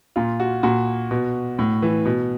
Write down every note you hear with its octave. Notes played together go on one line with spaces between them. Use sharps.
A#2 F4
F#4
A#2 F#4
B2
A2
E3
B2